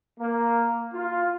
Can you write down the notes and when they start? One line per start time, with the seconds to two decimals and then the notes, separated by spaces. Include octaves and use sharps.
0.19 A#3
0.93 F4